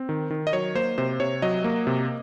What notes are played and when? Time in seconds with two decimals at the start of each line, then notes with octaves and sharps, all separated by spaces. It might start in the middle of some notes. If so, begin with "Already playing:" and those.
Already playing: C4
0.09 D#3
0.31 D#3
0.47 D#5
0.53 F#3 C#5
0.75 A#3 C5
0.98 C3 C5
1.20 C3 C#5
1.42 F#3 D#5
1.64 A#3
1.87 C3